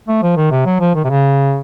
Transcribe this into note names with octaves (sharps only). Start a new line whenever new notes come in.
A3
F3
D#3
C3
F#3
F3
D#3
C3
C#3